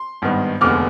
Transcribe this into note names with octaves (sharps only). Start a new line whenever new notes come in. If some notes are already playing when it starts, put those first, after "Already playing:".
Already playing: C6
G#1 G2 D#3 B3
F1 D#2 D3 G#3 B3 D6 F6